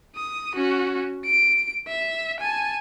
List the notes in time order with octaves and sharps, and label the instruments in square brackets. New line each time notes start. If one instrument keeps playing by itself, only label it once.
[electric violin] D#6
C#4 F#4
D7
E5
G#5 A5